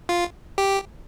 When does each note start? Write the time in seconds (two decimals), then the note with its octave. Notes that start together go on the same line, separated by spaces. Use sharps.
0.09 F4
0.58 G4